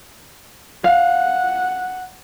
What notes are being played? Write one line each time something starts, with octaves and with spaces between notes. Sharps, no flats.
F5 F#5